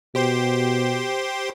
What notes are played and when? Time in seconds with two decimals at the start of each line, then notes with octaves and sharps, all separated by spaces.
0.15 B2 G4 C5 C6